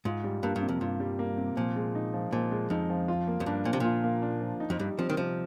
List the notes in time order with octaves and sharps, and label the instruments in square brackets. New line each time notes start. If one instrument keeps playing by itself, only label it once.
[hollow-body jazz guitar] G#2 [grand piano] F4
[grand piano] G3
[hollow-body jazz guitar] G2 [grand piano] A#3
[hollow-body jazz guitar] G2
[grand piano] C3
[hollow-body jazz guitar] F2
[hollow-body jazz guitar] G2 [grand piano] F4
[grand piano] G3
A#3
C3
[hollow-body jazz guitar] A#2 [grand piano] F3
[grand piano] G#3
D#4
F3
[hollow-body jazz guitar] A#2 [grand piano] F3
[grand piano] G#3
[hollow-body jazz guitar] F2 [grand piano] D#4
[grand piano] F3
F4
A#3
[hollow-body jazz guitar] F2
[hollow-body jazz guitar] G2 [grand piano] D4
[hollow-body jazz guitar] A#2 [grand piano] F3
[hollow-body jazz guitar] C3
[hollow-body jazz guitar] A#2 [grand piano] F4
[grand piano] A#3
D4
F3
D#4
[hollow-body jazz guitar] F2
[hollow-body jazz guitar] G2 [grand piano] G3
[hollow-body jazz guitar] F3 [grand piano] C4
[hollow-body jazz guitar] D#3
[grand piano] C3 [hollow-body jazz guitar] F3